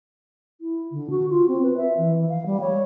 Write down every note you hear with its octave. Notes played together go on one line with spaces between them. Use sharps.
E4
D3
F#4
F4
C4
B4
E5
E3
F5
G3
C#5